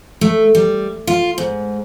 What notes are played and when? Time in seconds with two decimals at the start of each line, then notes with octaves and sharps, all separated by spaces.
0.21 A3
0.55 G3
1.07 F4
1.38 G#2